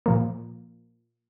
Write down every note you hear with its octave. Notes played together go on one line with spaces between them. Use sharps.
A#2 F3 A#3